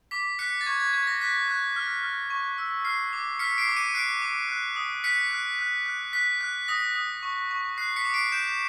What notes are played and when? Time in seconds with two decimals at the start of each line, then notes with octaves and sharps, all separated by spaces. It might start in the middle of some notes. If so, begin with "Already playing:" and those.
0.11 D6 B6
0.39 F#6 B6 C#7
0.61 A6
0.66 C#6 G#6
0.80 G#6
0.93 C#6 G#6
1.07 A#6
1.21 F#6 B6
1.48 F#6
1.76 F6
2.03 F6
2.30 C#6
2.58 E6
2.85 F6 C7
3.13 D6
3.39 F6 B6 C#7
3.58 C7 D7
3.67 D6
3.76 C#7 D#7
3.94 F#6 C7 D7
4.22 D6
4.49 F#6
4.76 D#6
5.04 F#6 B6 C#7
5.31 F#6
5.59 F#6
5.86 F#6
6.13 F#6 B6
6.41 F#6
6.68 D#6 A#6
6.96 D#6
7.23 C#6
7.51 C#6
7.77 F#6 C7
7.96 B6 C#7
8.05 D6
8.14 C7 D7
8.32 G6 D7 E7